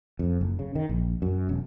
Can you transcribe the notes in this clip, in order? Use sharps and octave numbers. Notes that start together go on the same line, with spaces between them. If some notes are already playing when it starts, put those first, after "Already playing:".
F2
F#1
C#3
D#3
A#1
F#2
E1